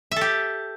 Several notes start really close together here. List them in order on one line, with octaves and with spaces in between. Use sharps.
E5 A4 G4